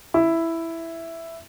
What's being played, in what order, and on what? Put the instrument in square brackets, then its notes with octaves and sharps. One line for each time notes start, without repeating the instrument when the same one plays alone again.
[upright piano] E4